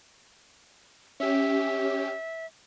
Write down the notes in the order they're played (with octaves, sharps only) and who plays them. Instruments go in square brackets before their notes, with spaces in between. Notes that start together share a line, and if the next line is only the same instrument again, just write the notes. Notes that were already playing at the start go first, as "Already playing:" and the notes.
[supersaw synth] C#4 G4 [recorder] E5